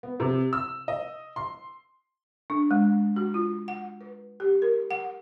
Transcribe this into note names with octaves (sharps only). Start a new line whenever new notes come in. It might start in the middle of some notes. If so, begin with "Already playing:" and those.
B3
C3
E6
D#5
C6
D4
G#3
F#4
F4
F#5
B4
G4
A#4
F#5